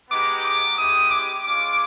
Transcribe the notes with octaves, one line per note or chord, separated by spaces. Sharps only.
G#3 B3 D#4 G4 D6
D6
G#3 C4 E4 G4 D#6
D6
G#3 C#4 F4 D6